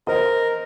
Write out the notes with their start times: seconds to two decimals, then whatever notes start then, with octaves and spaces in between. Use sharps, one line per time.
0.07 A#4 C5 D#5